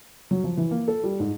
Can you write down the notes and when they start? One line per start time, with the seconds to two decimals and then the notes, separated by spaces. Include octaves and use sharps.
0.31 F#3
0.44 F3
0.57 E3
0.71 A#3
0.88 A4
1.04 G3
1.19 G#2